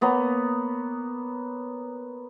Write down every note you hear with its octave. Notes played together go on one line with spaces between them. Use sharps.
A#3 B3 C#5 A#5